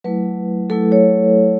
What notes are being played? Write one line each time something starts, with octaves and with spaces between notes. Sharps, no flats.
F#3 A3 E4 B4
F#3 A3 E4 A4
C#5